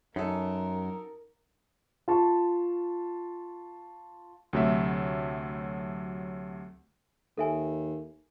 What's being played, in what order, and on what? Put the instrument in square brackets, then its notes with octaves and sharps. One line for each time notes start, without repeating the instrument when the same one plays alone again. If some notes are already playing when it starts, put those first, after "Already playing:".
[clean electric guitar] F#2 [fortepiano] D#4 A4 [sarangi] A#4
[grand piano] F4 A5 C#6
[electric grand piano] D2 C3 F#3 A3 E5
[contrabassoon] D#2 [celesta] A4 E5 G#5